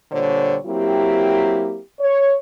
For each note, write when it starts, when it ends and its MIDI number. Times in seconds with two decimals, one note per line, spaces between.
0.12 0.57 46
0.12 0.57 50
0.12 0.57 55
0.12 0.57 72
0.12 0.57 73
0.66 1.79 54
0.66 1.79 58
0.66 1.79 60
0.66 1.79 64
0.66 1.79 67
2.00 2.35 73